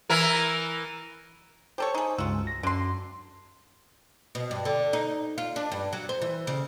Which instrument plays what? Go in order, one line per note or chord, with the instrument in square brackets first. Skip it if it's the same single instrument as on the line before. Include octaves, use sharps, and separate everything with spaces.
[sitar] E3 E4 A#4
[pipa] G4 A4 C#5 [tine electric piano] C5
[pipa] D#4 G#4
[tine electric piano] C#2 G2 E6 [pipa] F4 F#4
[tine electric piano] A#6
[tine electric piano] F#2 [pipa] D3 C6
[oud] B2
G2
D3
D#4
F4
D4
G2
F#3
C5
E3
C#3